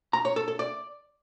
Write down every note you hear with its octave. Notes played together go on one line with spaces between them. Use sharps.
A#5
C#5
A4
A4
D5